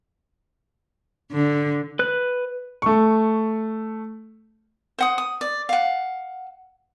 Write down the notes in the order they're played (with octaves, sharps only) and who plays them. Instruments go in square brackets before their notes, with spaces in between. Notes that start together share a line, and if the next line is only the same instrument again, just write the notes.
[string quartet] D3
[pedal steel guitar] B4 F#6
[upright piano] A3 C#6
[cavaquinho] C5 F#5 D#6
D#6
D5
F5 F#5